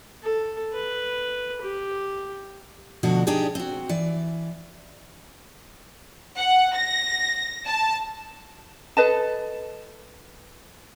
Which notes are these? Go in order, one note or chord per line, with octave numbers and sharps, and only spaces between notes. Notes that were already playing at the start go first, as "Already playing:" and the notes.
A4
B4
G4
D2 B2 F3 D4 F#4
D4 D#4 G4 G#4 D5
C4 F#4
E3 D5
F#5
A#6
A5
A4 B4 D#5 A5